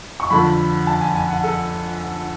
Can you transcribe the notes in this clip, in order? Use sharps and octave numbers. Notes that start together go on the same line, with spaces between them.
C#6
F2 D3 B5
A5
G#5
G#5
F#5
A4